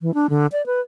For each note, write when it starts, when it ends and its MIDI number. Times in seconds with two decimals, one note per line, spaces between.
0.01 0.14 52
0.14 0.27 62
0.30 0.47 50
0.52 0.65 74
0.66 0.80 71